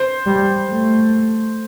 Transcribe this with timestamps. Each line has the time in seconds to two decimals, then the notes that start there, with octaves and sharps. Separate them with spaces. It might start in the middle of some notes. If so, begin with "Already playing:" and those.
Already playing: C5
0.26 G3
0.71 A3